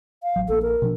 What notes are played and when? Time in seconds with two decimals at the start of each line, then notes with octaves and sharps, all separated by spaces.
0.23 F5
0.36 A1 F#3
0.49 A#1 A#3 A4
0.62 A#4
0.82 B2 F3 D4